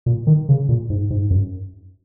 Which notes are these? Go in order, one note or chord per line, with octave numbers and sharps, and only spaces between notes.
A#2
D#3
C#3
A#2
G#2
G#2
F#2